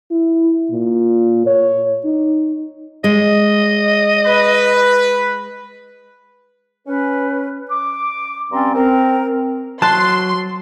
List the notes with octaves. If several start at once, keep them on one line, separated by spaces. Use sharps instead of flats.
E4
A#2
C#5
D#4
G#3 D#5
B4
C#4 B4
D6
G2 C4 C#4 D5 A#5 C6
C4 A#4
F#3 A5 C6 F#6